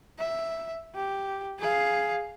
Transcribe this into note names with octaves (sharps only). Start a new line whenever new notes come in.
E5
G4
G#4 F5